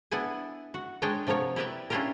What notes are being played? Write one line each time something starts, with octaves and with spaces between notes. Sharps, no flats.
B3 D4 E4 F#5 G#5
F#4
G#3 D4 C#5 D#5 G5
C3 F3 B3 A#4 C#5
E4 G4 A#4 B4 D5 E5
C#4 D4 E4 F4 G4 A#4